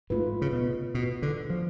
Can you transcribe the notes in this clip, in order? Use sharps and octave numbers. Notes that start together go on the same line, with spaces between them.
G#2 A3 F4 B4
C#3
B2
B2
D3
F3